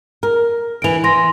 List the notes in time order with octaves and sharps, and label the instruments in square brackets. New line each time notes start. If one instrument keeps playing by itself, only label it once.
[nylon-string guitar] A#4
[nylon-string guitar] D2 E3 [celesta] D7 F7
[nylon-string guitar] E3 [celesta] C6 A#6